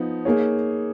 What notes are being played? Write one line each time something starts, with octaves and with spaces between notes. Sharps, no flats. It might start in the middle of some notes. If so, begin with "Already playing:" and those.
Already playing: F3 B3 D#4
A#3 D#4 G#4 C#5